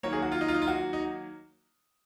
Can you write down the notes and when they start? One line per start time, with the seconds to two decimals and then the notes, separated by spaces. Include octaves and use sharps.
0.03 D#3 F#3 A#3 C#5
0.13 G#4
0.22 F#4
0.32 F4
0.41 D#4
0.48 F4
0.54 D#4
0.62 F4
0.68 F#4
0.93 D#4